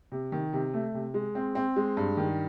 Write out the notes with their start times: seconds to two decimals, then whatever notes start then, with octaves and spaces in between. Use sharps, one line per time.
0.12 C3
0.32 D#3
0.53 C3
0.74 A3
0.94 C3
1.14 G#3
1.35 C4
1.55 C4
1.76 G#3
1.97 G2
2.17 D#3